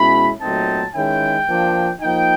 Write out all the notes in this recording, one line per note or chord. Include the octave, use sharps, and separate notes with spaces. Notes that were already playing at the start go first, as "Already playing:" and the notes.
Already playing: B2 G#3 C#4 E4 B5
A#2 F#3 A3 C4 D#4 A5
D#3 G#3 C#4 E4 G5
F3 A#3 D4
F3 A#3 D#4 G5